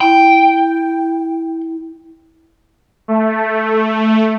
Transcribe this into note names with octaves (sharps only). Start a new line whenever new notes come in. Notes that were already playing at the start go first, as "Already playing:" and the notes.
E4 G5
A3